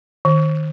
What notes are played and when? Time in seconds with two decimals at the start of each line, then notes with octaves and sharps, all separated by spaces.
0.25 D#3